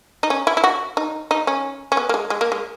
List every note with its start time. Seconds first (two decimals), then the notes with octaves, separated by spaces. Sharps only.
0.23 D#4
0.30 C#4
0.47 E4
0.57 E4
0.64 F#4
0.97 D#4
1.31 D#4
1.47 C#4
1.92 C#4
1.97 B3
2.09 A#3
2.14 G#3
2.30 G#3
2.41 A#3
2.52 G#3